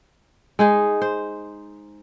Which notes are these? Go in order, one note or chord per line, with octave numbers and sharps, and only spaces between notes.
G#3 D#4 G#4
C5